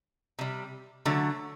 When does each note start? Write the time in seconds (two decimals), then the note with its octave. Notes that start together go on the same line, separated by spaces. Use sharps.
0.39 C3 G3
1.05 D3 F#3 A3